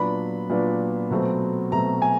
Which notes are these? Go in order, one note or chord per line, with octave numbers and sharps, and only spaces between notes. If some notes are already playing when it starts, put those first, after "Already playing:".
Already playing: A#2 F#3 B3 D4 B5
A#2 F#3 B3 D4
B2 F#3 A3 C4
B2 F#3 A3 C4 A#5
G#5